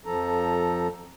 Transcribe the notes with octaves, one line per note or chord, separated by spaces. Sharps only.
F2 F3 A4 A#5